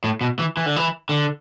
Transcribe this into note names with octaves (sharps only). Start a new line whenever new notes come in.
A2
B2
E3
E3
D3
E3
D3